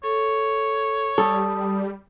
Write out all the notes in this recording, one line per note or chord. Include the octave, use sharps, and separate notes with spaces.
A4 C#5
G3 A4 D#6